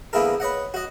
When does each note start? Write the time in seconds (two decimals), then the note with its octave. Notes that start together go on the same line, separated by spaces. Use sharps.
0.13 D3 A#3 B3 E4 G#4 A#4
0.40 B4 C#5 D#5 F#5
0.74 F#4 D#5